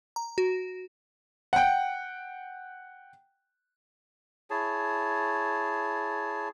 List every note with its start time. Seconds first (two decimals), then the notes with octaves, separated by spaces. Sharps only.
0.16 A#5
0.38 F#4
1.53 F#5 G5
4.50 E4 G#4 C#5 A5